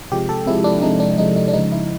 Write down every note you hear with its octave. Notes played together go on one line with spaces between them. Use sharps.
C3 F3 G#3 G4
A4
C3 F3 G#3 E4
D4
C3 F3 G#3 D#4
D4
C3 F3 G#3 D#4
D#4
D4
C#3 F3 G#3 D#4
E4